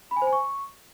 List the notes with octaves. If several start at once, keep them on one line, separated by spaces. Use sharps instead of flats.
B5
G#5
C5
G#5
C#6